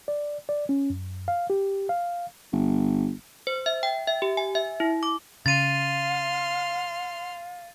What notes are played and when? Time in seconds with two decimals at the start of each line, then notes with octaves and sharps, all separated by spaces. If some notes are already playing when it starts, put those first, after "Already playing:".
0.08 D5
0.49 D5
0.69 C#4
0.90 F#2
1.28 F5
1.50 G4
1.89 F5
2.52 G1
3.47 C5
3.66 E5
3.83 G5
4.07 E5
4.22 G4
4.37 G#5
4.55 E5
4.80 E4
5.03 D6
5.46 C#3 F5 C6 F6 A6 D#7